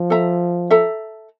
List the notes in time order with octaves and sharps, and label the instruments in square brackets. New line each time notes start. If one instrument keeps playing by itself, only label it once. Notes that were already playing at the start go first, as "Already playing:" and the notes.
Already playing: [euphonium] F3
[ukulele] A4 E5 A#5
A4 E5 A#5